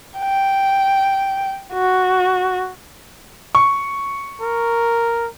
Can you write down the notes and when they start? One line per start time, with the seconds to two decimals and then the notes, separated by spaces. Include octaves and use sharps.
0.19 G5
1.73 F#4
3.55 C#6
4.41 A#4